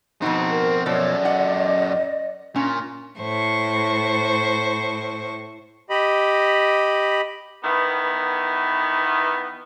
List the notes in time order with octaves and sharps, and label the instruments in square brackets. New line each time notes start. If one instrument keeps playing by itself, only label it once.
[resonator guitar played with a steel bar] F2 B2 D#4 [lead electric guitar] C4 F#4
[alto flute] A#4
[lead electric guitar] F#2 A4 [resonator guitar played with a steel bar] B2 F3 [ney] C#5 [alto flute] D5
[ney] D#5 [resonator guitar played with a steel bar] F#5
[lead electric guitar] A#2 [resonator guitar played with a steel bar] C#4
[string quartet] A2 C5 C#6
[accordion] G4 D#5 B5
[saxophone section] D#3 E3 B3